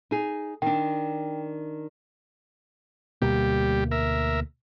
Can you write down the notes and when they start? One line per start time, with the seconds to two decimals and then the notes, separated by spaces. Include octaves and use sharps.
0.11 D#4 G#4
0.62 D#3 D4 G5
3.22 D2 B2 G3 A#3 G4
3.91 A#4 E5